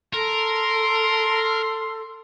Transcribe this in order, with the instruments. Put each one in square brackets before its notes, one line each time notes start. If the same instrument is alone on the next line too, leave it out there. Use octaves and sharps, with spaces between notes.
[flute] A4 [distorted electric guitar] A#4 [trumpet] C6